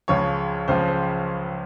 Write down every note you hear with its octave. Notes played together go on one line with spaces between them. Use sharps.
C#2 C#3 F3 C#5
C#2 C#3 F3 C5
C5